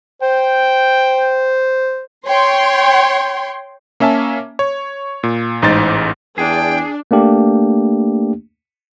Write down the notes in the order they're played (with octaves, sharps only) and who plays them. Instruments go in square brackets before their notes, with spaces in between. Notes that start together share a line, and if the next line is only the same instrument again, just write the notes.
[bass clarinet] C5 [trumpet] G5
[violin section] C#5 G5 C6
[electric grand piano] A#3 C#4 E5 G#5 A5
C#5
A#2
A1 G#2 D#4 C5 A6
[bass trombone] E2 [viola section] D4 [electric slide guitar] G#4 [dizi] G5
[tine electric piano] A3 A#3 D4 G4